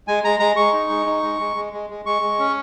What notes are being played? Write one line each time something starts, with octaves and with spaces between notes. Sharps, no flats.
G#3 G#5
G#3 A#5
G#3 A#5
G#3 C#6
D#4
G#3
D#4
G#3
G#3
G#3
G#3
G#3
G#3 C#6
G#3
C#4